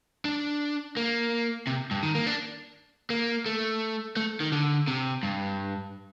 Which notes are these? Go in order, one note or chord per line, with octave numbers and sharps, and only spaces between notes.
D4
A#3
C3
G2
D#3
A#3
D4
A#3
A3
A3
D#3
D3
C3
G2